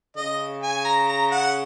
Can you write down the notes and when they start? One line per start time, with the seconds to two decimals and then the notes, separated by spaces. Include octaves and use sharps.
0.16 C#3 D#5
0.63 G#5
0.85 A#5
1.08 A#5
1.31 F#5